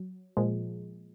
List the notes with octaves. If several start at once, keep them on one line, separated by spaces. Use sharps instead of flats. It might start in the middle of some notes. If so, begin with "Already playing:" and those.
Already playing: F#3
A#2 F3 G#3